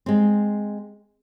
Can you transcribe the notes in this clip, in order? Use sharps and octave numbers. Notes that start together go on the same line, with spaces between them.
G#3 C4